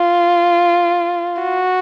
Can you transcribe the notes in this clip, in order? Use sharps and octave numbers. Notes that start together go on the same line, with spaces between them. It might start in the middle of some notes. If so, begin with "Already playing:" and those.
Already playing: F4
F#4